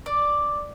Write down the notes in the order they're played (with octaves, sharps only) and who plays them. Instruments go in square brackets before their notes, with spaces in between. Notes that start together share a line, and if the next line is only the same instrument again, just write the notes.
[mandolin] D5